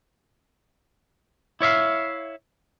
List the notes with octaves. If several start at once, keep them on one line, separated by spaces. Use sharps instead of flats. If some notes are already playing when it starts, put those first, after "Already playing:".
E4 C#5 E5 F5